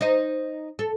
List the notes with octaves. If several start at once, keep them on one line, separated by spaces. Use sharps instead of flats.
D#4 C5 D#5
A4